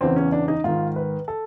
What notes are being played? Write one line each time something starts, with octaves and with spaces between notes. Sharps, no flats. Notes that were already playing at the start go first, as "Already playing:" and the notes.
E2 C#3 E3 C4
C#4
D4
D#4
G#2 D#3 F4
B4
A4